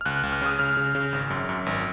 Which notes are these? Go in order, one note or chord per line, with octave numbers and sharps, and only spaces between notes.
F6
C#2 F#6
C#2
F6
C#3 D#6
C#3 F6
C#3
C#3
G#1
F#2
F#2
G#1